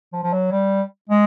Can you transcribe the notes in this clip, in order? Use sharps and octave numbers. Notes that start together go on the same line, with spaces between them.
F3
F3
F#3
G3
G#3